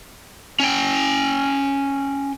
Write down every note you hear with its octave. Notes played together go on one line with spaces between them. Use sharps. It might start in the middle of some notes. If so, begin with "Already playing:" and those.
C#4 G5